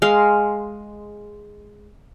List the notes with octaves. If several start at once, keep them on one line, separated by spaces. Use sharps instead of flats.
G#3 F5 C6